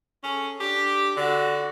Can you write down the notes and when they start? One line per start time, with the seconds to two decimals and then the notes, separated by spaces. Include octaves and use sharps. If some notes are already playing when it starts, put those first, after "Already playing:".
0.24 C#4 G#4 A4
0.60 D4 G4
1.17 D3 F#4